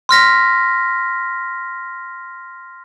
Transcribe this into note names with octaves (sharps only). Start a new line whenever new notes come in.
C6 F6 A#6 B6